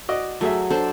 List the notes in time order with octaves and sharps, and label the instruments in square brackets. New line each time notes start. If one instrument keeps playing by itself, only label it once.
[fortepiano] F#4 D5 D#5
[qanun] F#3 [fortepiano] A3 G#4 E5
[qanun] D4 A4 C5